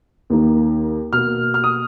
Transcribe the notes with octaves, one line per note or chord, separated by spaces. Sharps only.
D#2 D#3 A#3
B2 A#3 F6
F6
D#6